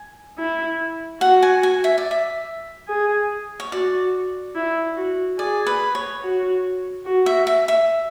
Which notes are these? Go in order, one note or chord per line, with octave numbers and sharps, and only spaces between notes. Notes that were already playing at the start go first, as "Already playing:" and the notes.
Already playing: G#5
E4
F#4 F#5
G#5
G#5
E5
D5
E5
G#4
C#5
F#4 D5
E4
F#4
G#4 D5
B4
C#5
F#4
F#4
E5
E5
E5